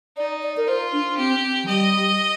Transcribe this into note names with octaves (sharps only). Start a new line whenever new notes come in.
D#4 D5
D5
A#4
F4 C5
D4
C4 G4
F3
G3 D#5